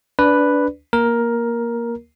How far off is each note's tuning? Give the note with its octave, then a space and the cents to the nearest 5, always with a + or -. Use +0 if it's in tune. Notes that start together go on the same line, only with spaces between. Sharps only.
D4 -20 B4 +0 D5 +0
A#3 +10 A#4 +10